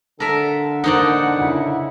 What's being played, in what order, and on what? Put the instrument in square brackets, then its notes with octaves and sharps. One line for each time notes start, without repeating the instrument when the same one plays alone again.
[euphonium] D3 [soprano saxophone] A4 [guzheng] A#4 E5
[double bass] A#3 [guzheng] D#4 C5 D5 [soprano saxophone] F#5
[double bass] C#3 E4